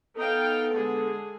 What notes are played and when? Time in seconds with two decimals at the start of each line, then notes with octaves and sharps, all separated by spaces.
0.17 B3 D#4 A4 F5 G5
0.74 D3 G#3 G#4